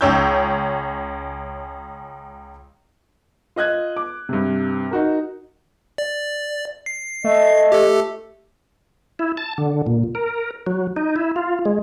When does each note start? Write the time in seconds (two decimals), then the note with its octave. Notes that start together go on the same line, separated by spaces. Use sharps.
0.01 C#2 C#4 C#5 E6 G6
3.56 F4 D#5 F#6 G#6
3.97 D6
4.29 G2 C3
4.91 D#4 F#4 A#4
5.98 D5
6.86 C7
7.24 A3 D#5
7.72 G4 A4
9.19 E4
9.37 A5
9.58 D3
9.87 A#2
10.15 A#4
10.66 F#3
10.96 D#4
11.16 E4
11.36 F4
11.65 G#3